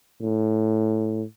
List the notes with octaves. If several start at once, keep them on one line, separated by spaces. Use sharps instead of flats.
A2